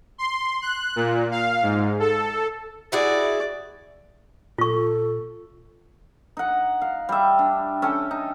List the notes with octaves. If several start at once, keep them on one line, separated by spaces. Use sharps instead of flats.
C6
F#6
A#2
F5
G#2
A4
E4 F#4 G#4 D5
A#2 F4 A4 C#6
D#4 F#5
F5
G3 E5
D4
C#4 A4 G5
D#4